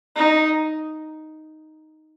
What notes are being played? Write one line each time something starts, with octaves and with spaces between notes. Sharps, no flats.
D#4